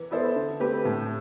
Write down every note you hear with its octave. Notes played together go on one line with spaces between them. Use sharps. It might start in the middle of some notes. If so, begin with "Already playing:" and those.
Already playing: E3
B3 E4 A4 C5
D3
A3 C4 G4 B4
A2